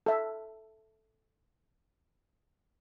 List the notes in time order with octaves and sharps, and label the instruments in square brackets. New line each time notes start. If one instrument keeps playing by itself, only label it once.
[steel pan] A4 E5